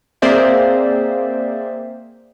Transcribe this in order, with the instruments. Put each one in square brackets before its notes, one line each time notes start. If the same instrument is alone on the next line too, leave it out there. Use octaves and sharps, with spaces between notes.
[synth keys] A#3 C4 G#4 C5 D5 E5